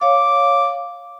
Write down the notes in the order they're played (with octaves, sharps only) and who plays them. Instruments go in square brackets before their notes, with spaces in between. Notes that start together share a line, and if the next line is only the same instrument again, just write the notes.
[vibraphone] C#5 F5 [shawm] D6